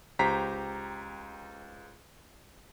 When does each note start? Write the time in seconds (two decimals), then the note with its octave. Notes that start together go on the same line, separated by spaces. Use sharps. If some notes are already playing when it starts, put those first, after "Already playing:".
0.19 C#2 G4 C5 A#5 B6 C7